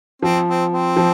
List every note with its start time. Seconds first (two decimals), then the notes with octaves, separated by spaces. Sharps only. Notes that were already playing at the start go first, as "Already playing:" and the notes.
0.22 F3 C4
0.48 C4
0.72 C4
0.97 F3